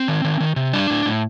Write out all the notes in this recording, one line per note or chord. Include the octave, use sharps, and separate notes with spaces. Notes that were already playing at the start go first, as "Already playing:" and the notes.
Already playing: C4
D#3
D#3
D#3
C3
G3 D4
A2
A2